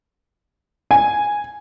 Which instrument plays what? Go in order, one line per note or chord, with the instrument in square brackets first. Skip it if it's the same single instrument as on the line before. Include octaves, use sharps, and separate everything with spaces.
[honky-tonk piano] G#5